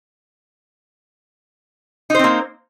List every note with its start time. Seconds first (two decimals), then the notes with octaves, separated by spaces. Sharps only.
2.10 D#4
2.15 C5
2.19 C4
2.24 A#3